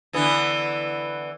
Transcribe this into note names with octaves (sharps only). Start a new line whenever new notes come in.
D3 E3 B3